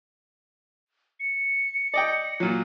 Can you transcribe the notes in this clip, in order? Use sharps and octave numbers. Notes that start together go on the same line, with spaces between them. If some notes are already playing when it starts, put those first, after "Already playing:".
C#7
D5 D#5 G5
A#2 F#3